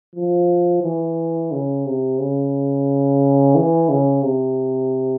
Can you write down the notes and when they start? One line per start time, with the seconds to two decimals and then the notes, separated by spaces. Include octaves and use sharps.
0.15 F3
0.83 E3
1.52 C#3
1.86 C3
2.19 C#3
3.55 E3
3.89 C#3
4.23 C3